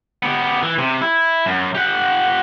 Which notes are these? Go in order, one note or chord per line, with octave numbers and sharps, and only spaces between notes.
B3 G4
E3
C3
E4
F#2
G4 F#5